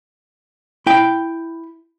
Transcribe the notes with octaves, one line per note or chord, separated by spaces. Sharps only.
E4 G5